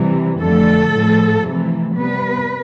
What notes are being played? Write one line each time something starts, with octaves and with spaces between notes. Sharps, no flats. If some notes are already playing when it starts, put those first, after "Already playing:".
Already playing: C3 E3 G3
F2 D3 A3 A4
A2 F3 A3
F2 C3 E3 A3
C3 G3 B3 B4